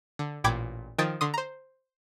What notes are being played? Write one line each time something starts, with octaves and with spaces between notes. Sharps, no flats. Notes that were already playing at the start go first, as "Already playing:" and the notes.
D3
A1 A#2 G5 B5 D6 G#6
D#3 F3 G5 D#6 G#6 A6
D3 C6 D#6
C5 A#5